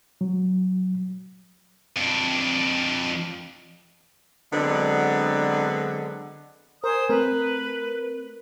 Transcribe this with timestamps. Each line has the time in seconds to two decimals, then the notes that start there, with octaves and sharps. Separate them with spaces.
0.21 F#3
1.97 F2 D4
4.53 D3 F#3 G#3 B3 C4 D4
6.84 A#4 C5 G#5 D#6
7.09 A3 C4 A#4 B4